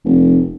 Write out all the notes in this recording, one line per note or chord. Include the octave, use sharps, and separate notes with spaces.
F1